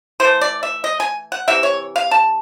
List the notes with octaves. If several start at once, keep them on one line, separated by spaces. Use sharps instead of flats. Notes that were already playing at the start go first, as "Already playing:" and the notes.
E3 A3 C5
D5
E5
D#5
G#5
F#5
C3 E3 E5
C#5
F5
A5